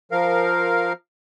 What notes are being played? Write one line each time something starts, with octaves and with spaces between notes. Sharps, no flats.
F3 A#4 F5